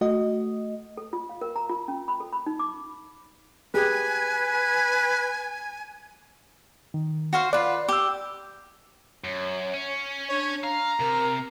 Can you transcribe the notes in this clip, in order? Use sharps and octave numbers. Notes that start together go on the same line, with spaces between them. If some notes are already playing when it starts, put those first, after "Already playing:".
A3 F#4 D#5
A4
F4
F5
A#4
A#5
F4
C#4
B5
A4
B5
D#4
D6
G4 G#4 B4 G#5
D#3
F#4 C5 F5
F4 B4 D5
G4 D6 E6
F#2 C#5
C#4
D4 C#5
F5 A#5
C3 A#4